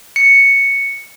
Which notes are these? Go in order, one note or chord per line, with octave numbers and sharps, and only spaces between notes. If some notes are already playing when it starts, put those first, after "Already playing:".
C#7